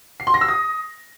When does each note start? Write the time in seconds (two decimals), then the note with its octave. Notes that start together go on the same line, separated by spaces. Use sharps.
0.20 C7
0.27 C6
0.34 A#6
0.41 E6
0.48 D#6